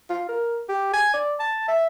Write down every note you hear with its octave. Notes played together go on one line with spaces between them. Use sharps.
F4
A#4
G4
G#5
D5
A5
E5